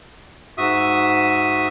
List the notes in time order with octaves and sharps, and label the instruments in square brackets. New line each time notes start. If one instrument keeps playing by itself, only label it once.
[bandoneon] G#2 F#4 E5 D#6